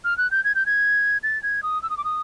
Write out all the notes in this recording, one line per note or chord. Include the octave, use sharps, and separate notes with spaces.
F6
F#6
G6
G#6
G6
G#6
A6
G#6
D#6
E6
D#6
D6
D#6